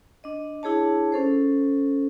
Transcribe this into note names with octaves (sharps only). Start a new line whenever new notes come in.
D4 D#5
D4 E4 G#4 C#5 A5
C#4 A4 C5